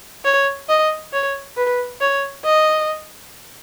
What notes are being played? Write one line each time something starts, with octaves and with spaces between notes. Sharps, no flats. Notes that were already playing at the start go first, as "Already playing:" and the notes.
C#5
D#5
C#5
B4
C#5
D#5